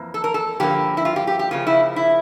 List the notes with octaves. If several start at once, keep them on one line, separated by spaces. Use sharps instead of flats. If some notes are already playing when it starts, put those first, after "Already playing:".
Already playing: F2 E3 A#3
A4
A#4
A4
G2 D3 F3 A#3 G4
E4
F4
G4
G4
G4
C#3 F3 A#3 F4
E4
E4